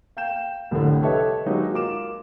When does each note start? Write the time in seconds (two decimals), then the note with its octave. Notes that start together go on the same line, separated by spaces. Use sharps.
0.17 F5 G5 G6 E7
0.71 C2 F2 A2 D3
1.02 G4 A4 B4 C#5 D#5 E5
1.46 F#3 G#3 A#3 D#4 G4 D#5
1.73 F4 A#4 D6 E7